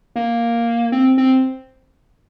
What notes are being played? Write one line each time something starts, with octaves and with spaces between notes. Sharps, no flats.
A#3
C4
C4